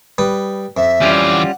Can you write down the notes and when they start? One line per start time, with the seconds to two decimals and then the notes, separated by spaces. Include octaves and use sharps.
0.18 G3 B4 D#6
0.77 F2 E5
1.01 E3 G3 C#4 F4 D5
1.32 F#5